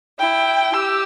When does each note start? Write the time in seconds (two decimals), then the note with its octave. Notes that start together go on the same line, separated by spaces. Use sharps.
0.20 E4 G5
0.74 G4 E6